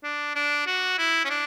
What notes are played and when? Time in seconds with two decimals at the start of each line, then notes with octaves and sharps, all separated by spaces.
0.04 D4
0.35 D4
0.66 F#4
0.98 E4
1.25 C#4
1.30 D4